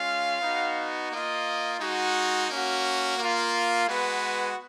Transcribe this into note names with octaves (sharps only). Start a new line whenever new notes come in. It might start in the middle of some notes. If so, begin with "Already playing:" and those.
Already playing: G#3 C#4 F4 F5
B3 D#4 F#4
A#3 F4 D#5
G#3 D#4 F#4
A#3 C#4 F#4
A#3 F4
G#3 B3 F#4 B4